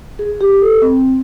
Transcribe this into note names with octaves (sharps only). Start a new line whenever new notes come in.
G#4
G4
A4
C4